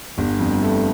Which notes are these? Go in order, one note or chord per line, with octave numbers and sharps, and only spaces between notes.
G1 G2
F2
A3